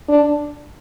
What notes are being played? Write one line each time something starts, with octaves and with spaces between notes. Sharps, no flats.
D4